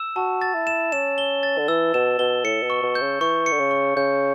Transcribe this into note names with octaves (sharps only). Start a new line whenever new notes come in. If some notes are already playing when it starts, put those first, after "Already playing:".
Already playing: E6 E7
F#4 A5
A6
E4
E7
C#4 E7
G7
A6
D3
E3 E6
B2 E7
B2 G7
A2 C#7
B2
C#6
B2
G6
C#3
E3 C#6
C#7
D3
C#3
C#6
C#3 G6